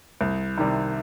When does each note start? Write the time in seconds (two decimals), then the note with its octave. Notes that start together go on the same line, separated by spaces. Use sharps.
0.21 C2
0.58 C3 D#3 G3